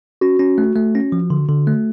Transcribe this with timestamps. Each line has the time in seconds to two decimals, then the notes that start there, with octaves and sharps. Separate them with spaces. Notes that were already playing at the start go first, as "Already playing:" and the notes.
0.21 C#4 F#4
0.39 C#4
0.58 A3
0.75 A3
0.95 C#4
1.12 F3
1.30 D3
1.49 D3
1.67 A3